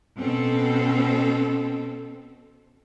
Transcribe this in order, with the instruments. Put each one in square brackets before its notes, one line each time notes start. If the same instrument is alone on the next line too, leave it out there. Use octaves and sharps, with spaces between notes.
[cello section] B2 C4 C#4 A4